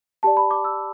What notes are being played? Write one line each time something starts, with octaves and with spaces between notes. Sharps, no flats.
G4 D5 A5
B5
D6
E6